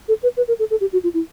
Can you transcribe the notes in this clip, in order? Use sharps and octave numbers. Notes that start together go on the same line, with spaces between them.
A4
B4
B4
A#4
A4
A4
G4
F#4
F4
E4